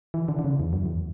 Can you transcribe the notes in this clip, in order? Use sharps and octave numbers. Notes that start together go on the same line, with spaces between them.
E3
D3
D3
C#3
E2
F#2
E2